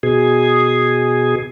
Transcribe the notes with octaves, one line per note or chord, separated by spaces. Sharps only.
B2 G#4